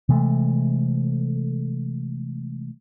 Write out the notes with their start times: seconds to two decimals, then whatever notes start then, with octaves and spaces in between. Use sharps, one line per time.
0.09 C3 E3 G#3 A3